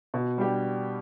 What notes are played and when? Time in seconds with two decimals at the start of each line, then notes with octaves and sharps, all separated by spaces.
0.14 B2
0.38 G3 D4 G4